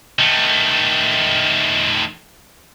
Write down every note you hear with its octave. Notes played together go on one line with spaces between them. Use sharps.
D#3 A3